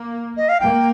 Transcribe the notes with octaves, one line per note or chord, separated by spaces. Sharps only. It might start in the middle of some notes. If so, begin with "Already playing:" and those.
Already playing: A#3
D#5
F5
A#3 G5